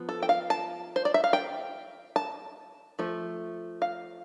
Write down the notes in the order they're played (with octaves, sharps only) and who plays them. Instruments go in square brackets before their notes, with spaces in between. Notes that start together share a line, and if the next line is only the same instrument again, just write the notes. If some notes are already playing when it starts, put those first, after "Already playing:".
Already playing: [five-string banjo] F3 B3
A4
G5
F5
A5
C5
D5
E5
F5
G5
A5
F3 A3
F5